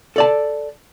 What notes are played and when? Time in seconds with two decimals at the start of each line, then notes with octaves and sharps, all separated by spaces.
0.16 A4 D5 A5